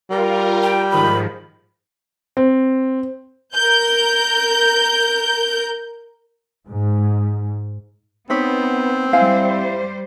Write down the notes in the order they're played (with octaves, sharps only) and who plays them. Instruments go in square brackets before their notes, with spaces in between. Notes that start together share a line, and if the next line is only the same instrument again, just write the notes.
[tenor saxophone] G3 [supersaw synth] F4 A#4
[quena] G5
[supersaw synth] G#2 D#3 F3 [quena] B5
[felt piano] C4
[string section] A#4 G6
[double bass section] G#2
[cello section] B3 [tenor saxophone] C4 [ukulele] D#4 B4 C#5
[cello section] G3 C5 [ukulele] E4 F5 G#5